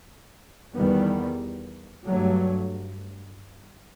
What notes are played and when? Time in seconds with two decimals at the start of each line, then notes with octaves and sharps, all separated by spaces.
0.75 E2 D#3 G3 B3
2.08 G2 F#3 A3